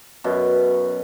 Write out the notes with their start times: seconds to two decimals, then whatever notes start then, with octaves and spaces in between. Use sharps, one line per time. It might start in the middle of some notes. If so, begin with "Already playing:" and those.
0.24 F#2 B2